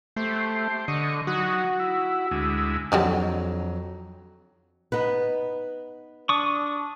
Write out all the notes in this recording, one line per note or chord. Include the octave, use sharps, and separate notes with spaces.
A3 G4 C5
D3 D#5 C#6
F#3 D#4 F#4
E4
D2 G#3 E4
F2 D3 D#3 F#3 G3
B3 D#4 B4
D4 C#6 D#6